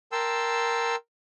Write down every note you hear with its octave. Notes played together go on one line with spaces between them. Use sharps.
A#4 G5 A5 C6 E6